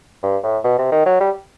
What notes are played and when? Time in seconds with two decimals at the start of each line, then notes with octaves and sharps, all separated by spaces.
0.23 G2
0.43 A2
0.65 B2
0.79 C3
0.92 D#3
1.06 F#3
1.20 G3